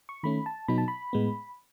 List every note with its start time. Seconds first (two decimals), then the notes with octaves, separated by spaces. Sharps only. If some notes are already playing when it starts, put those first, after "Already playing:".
0.09 C#6
0.23 D#3 A3 C#4 B5
0.46 A5
0.68 B2 F#3 B3 D#4 B5
0.78 A5
0.88 B5
1.13 A2 G#3 B3